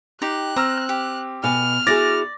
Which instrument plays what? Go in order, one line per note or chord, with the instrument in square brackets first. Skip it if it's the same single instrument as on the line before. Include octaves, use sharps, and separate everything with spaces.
[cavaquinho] D#4 G4 C6 [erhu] F#6
[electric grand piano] C4 E6 F6 [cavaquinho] A#5
[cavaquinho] G4
[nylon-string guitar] B2 F5 G#5 [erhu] F6
[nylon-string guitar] E4 F#4 G#4 [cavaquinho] D5 [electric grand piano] D6 A6 A#6